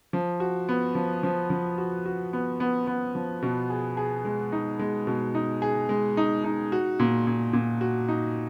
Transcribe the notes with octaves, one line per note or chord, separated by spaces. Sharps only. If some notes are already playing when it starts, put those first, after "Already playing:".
F3
F#4
B3
F3
F3
F3
F#4
F#4
B3
B3
B3
F3
B2
G#4
G#4
G#3
D#4
G#3
B2
D#4
G#4
G#3
D#4
D#4
F#4
A#2
A#2
A#2
F#4
D#4